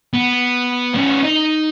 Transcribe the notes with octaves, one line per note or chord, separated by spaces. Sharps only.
B3
B3 C#4
D#4